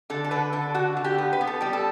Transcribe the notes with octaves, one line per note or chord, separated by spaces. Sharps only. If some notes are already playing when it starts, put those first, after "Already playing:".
D3 A4
A4
D3 B4
D3 A4
D3 F#4
D3
G4
B3
B4
B3
A4
G3 G4
A4